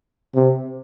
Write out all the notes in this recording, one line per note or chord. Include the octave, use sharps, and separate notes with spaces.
C3